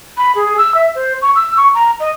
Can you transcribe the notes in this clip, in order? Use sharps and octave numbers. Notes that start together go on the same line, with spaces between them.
B5
G#4
E6
E5
C5
C#6
E6
C#6
A#5
D#5